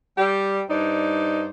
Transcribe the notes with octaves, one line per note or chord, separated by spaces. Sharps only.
G3 G4
G2 D#4 C5 D5